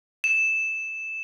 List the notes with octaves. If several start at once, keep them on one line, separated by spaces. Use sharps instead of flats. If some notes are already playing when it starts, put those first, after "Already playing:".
E7